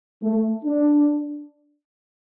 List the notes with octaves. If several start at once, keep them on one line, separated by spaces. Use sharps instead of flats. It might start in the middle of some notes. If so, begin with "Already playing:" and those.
A3
D4